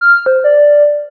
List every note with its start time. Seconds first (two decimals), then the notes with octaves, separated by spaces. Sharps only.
0.01 F6
0.26 C5
0.44 D5